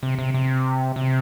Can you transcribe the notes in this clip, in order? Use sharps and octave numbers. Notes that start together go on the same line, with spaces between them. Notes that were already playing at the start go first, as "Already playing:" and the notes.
C3
C3
C3
C3